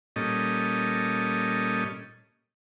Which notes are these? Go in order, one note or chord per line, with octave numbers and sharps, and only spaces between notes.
A#2 G3 C#4 A4 D#5